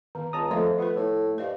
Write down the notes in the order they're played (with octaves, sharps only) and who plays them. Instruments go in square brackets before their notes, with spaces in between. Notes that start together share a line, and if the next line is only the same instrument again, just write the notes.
[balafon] D#3 B3
[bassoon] C#2 [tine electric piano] A5 A#5 D#6
[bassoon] F2 [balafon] F3 D#5 F5 [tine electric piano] A3
[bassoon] B3 [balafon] F4 B4
[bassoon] A2
[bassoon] G2 [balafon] C5 D#5 F5